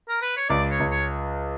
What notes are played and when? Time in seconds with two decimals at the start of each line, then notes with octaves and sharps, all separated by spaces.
0.09 A#4
0.22 B4
0.37 C#5
0.49 C#2 D5
0.71 C#5
0.80 C#2
0.91 C#5